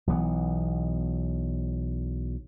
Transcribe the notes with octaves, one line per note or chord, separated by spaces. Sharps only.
B1 E3 B3